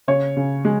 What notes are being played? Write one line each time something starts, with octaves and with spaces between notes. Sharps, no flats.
C#3 C#5
C#3
G#3